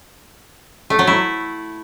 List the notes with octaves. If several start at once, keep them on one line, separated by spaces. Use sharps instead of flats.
A3
F#3
E4